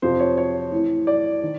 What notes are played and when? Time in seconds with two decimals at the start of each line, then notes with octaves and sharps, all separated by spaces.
0.02 F2 C3 F3 C5
0.20 C#5
0.37 C#5
0.72 A2 E3
1.07 D5
1.43 D#3